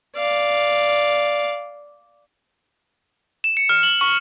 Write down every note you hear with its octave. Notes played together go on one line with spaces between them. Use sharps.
D5 F5
E7
C#7
F6
F#7
C#6